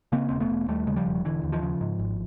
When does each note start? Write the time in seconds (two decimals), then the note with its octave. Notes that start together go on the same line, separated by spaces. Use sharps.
0.12 C#3 A#3 C4
0.29 E1 C4
0.40 A3 B3
0.50 E1
0.68 D#2 G3 A3
0.87 C#3 G#3
0.96 F3 G3
1.06 E1
1.25 E1 D3 E3
1.43 D#2
1.52 D#3 F3
1.62 C#3
1.81 G#2
1.99 G#1